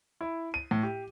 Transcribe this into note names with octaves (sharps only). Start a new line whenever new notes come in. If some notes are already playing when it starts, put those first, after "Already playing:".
E4
D#7
A2
G4